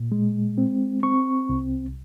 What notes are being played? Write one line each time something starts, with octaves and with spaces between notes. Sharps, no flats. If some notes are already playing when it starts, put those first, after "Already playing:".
Already playing: A#2
G#3
C4
C4 C#6
C2